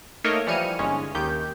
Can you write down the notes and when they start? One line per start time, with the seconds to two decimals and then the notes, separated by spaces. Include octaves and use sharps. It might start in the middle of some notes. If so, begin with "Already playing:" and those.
0.24 A3 A#3 D#4 A#4 C#5 D#5
0.47 E3 F3 G3 F6 C#7 D#7
0.79 G1 G#2 G#3 C#4 C#5
1.15 D#2 D#3 G4 G6